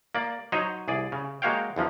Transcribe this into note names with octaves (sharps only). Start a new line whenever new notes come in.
A#3 D5
F#3 D#4 C5 C#5 D#5
C2 G#4 D5
C#3
G#3 A#3 F#4 C#5 F5 G5
E2 D3 F3 F#3